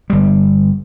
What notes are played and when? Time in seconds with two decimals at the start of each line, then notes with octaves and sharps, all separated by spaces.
0.10 G1 G3